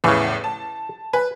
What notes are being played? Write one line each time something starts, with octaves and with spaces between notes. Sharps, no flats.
E2 A2 C#3 E3
A5
B4 G#5